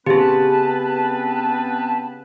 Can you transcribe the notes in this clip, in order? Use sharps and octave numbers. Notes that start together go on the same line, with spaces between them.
C#3 B3 C4 G4 G#4 B4 A5